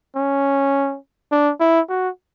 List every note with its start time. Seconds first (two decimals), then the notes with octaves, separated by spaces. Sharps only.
0.16 C#4
1.32 D4
1.60 E4
1.89 F#4